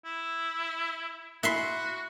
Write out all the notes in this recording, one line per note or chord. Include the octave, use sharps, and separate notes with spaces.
E4
E4 F#4 E5 C6